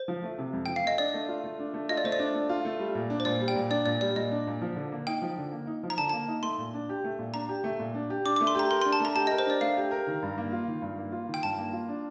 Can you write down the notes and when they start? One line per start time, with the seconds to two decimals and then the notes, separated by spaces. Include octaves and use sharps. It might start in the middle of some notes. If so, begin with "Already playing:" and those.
Already playing: C5
0.08 F3
0.23 A3
0.38 C3
0.53 F2
0.66 F3 G5
0.76 F5
0.84 A3 D#5
0.98 D4 D5
1.14 A3
1.28 F4
1.44 A3
1.59 D4
1.74 A3
1.89 F4 D#5
1.97 D5
2.04 A3 C5
2.12 D5
2.19 D4
2.34 A3
2.49 F4
2.65 A3
2.79 G3
2.95 A#2
3.10 D4
3.20 C5
3.25 A#2 D5
3.40 G3
3.48 G5
3.55 A#2
3.70 D4 D5
3.86 A#2 D5
4.01 G3 D5
4.16 A#2 D#5
4.31 D4
4.47 A#2
4.62 F3
4.76 D3
4.92 A#3
5.07 D#4 G5
5.22 F3
5.38 D3
5.52 A#3
5.67 D#4
5.83 F3
5.90 A#5
5.98 D3 A5
6.10 A#3 A5
6.28 D#4
6.43 A3 C6
6.58 A#2
6.74 D4
6.89 G4
7.04 A3
7.19 A#2
7.34 D4 A#5
7.49 G4
7.64 A3
7.80 A#2
7.95 D4
8.10 G4
8.25 D4 D6
8.36 A3 D6
8.47 C6
8.55 G4 A#5
8.70 A#4 C6
8.82 D4 C6
8.93 A5
9.00 A3 A#5
9.15 G4 A5
9.27 A#4 D#5
9.38 C5
9.46 D4 D5
9.61 A3 F5
9.77 G4
9.91 A#4
10.07 D#3
10.22 G2
10.38 A#3
10.52 F4
10.68 D#3
10.82 G2
10.98 A#3
11.12 F4
11.28 D#3
11.34 G5
11.43 G2 A5
11.58 A#3
11.73 F4
11.89 D4